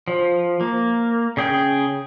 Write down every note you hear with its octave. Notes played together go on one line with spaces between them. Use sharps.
F3
A#3
C#3 G#4 G5